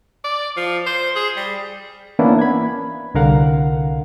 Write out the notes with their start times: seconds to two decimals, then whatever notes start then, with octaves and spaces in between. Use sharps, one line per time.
0.24 D5
0.57 F3
0.86 C5
1.15 G#4
1.37 G3
2.19 E3 A#3 B3 C#4 D4 E4
2.39 B5 G#6
3.15 C2 D3 A#4 F5 F#5